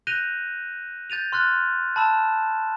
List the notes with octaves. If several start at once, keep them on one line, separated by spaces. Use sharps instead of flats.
F#6 G6 A#6 D#7 F7 G7
G6 A6 D#7 F7
C6 F6 F#6 A6
A5 B5 E6 E7